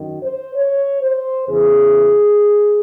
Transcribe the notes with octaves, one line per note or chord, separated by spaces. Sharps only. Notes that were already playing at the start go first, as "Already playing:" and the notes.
Already playing: F#2 D#3
C5
C#5
C5
E2 C#3 E3 G#4